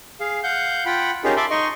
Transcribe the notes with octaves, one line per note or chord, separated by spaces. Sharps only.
G#4 F5
F5 F#5 G6
F4 F#5 G5 B5
C#4 D#4 F4 G4 G#4 A#4
E5 A5 B5 C6 D6
D#4 D#5 C6 C#6